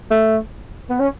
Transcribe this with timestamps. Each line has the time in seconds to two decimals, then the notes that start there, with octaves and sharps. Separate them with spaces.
0.11 A3
0.90 B3
1.00 C#4